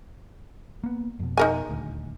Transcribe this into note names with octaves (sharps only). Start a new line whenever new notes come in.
A#3 B3
F2 B2
D#4 A#4 G#5
D#1 D2